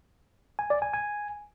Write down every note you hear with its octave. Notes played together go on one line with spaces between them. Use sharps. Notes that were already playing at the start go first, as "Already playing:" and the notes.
G#5
D5
G#5
G#5